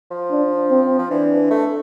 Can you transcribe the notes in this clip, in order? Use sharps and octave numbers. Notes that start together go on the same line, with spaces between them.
F3
D4
C4
F3
E3 D4
A3